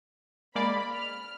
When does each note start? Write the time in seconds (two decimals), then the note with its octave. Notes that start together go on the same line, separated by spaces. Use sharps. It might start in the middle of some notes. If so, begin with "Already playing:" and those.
0.55 G#3 A#3 D5 B5
0.93 F6